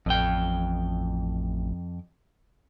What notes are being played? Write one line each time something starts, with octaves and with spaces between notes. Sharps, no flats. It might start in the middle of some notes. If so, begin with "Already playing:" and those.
A1 F2 G5